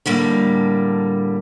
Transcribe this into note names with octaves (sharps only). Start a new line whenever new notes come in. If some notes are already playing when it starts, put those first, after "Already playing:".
A2 D3 G3 A#3